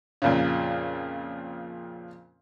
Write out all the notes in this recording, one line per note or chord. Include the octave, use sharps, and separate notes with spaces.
F2 A#2 C#3